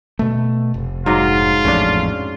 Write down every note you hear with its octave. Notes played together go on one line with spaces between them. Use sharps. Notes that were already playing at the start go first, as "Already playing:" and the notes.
B2 A3
F1
G#2 F#3 F4 D#5
A1 F2 C#4 D4